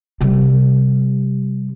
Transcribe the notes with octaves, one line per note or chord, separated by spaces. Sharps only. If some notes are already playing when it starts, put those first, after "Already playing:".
C3 G3